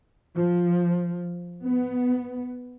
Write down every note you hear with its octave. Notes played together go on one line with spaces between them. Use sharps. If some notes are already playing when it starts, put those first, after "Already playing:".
F3
B3